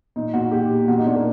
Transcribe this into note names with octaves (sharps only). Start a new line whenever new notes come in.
A#2 D#4
A#2 F#4
A#2 G4
A#2
A#2 F#4
D#4
A#2 D4
A#3